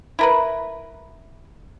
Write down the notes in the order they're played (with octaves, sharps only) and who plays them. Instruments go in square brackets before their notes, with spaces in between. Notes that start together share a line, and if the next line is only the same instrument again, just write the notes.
[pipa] E4 A#4 B4